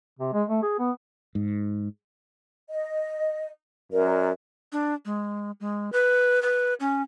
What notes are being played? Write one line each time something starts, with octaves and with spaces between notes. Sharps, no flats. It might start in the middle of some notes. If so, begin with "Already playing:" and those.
C3
G#3
A3
G#4
B3
G#2
D#5
F#2 A#4 D5
D4
G#3
G#3
B4
B4
C#4